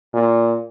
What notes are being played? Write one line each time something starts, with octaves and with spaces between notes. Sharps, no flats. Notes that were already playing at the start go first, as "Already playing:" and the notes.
A#2